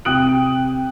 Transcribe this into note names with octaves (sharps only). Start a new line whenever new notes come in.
C3 G5 D#6 F#6 D7 F#7